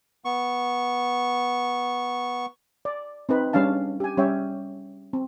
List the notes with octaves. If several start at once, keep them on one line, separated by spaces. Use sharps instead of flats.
B3 C#6
D5
C4 D#4 B4
G3 C#4 D4 F5 A5
G4 G#5
G3 C#4 C#5 E5 G5
C4